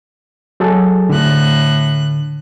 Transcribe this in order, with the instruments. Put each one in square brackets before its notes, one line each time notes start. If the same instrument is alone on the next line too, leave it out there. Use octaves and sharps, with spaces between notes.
[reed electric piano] F#3 G#4 A4
[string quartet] A2 F#6 [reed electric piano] D3